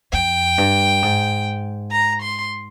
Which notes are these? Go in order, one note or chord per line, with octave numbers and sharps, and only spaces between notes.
F2 G5
G2
G#2
A#5
C6